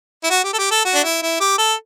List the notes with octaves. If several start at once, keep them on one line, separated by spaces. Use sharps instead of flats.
E4
F#4
G4
A4
G4
A4
F#4
D4
E4
E4
G4
A4